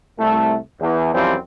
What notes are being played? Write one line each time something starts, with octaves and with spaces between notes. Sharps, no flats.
C2 A3
E2
F#2 E3 F3 G3 C4